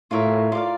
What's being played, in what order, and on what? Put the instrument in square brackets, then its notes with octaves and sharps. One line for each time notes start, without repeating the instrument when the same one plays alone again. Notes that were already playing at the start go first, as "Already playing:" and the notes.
[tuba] A2 [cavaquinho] F4 A#4 C#5 E5
[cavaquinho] F4 A#4 D5 F5